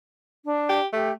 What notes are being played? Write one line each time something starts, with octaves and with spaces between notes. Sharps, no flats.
D4
G4
A3 G4